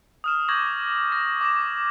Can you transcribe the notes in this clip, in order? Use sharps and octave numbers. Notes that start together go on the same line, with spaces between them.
D#6 F6 E7
C#6 D6 G6 G#6 A#6 F#7
A#6
D6 A#6 E7